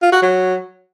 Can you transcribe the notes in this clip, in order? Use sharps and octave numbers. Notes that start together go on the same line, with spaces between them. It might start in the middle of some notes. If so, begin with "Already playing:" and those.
F4
F#4
F#3